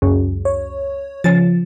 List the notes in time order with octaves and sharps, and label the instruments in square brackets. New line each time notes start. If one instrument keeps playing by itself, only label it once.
[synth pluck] C#2 F#2
[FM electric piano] C#5
[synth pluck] C#3 A6 [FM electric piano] F3